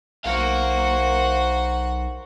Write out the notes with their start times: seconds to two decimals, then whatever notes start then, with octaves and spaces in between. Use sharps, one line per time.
0.25 B1 F#4 A#4 C5 F5 F#5